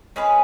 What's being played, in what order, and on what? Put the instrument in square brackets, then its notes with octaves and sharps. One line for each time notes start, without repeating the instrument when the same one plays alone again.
[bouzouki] G#3 C#4 G#4 B4